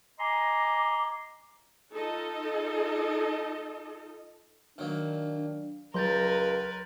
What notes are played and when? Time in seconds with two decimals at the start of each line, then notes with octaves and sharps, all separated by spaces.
0.19 D#5 G#5 A#5 C6 D6
1.94 D#4 F4 A4 D#5
4.78 D#3 F#3 A#3 D4
5.94 C#2 F#3 A#4 B4 C6 G6 A6 A#6